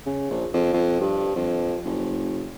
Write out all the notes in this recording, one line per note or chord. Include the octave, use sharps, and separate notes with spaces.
C#3
A#1
F2
F2
G2
F2
F#1